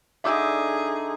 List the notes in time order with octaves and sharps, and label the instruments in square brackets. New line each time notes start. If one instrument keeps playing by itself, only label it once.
[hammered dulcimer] D3 D#4 [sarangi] G#4 [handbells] E5 D6 E6